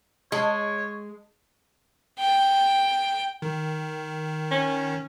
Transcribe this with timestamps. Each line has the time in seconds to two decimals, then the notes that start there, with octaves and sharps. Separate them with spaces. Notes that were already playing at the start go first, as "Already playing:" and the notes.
0.32 G#3 C#5
2.19 G5
3.42 D#3
4.51 C#4